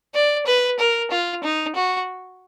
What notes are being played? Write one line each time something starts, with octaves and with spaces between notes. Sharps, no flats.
D5
B4
A#4
F4
D#4
F#4